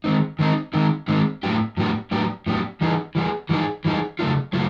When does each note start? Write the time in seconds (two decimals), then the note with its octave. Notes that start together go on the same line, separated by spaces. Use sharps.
0.04 D#3 G#3 C4 D#4
0.39 D#3 G#3 C4 D#4
0.73 D#3 G#3 C4 D#4
1.08 D#3 G#3 C4 D#4
1.43 A2 F#3 B3 D4 G4
1.77 A2 F#3 B3 D4 G4
2.11 A2 F#3 B3 D4 G4
2.46 A2 F#3 B3 D4 G4
2.81 E3 G3 B3 D#4 G#4
3.15 E3 G3 B3 D#4 G#4
3.49 E3 G3 B3 D#4 G#4
3.85 E3 G3 B3 D#4 G#4
4.19 C#3 F#3 A3 D4 F4
4.53 C#3 F#3 A3 F4